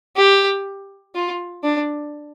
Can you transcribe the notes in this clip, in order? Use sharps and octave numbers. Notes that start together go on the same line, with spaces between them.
G4
F4
D4